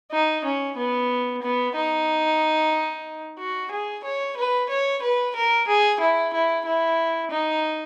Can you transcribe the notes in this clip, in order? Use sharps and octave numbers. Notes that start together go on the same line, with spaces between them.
D#4
C#4
B3
B3
D#4
F#4
G#4
C#5
B4
C#5
B4
A#4
G#4
E4
E4
E4
D#4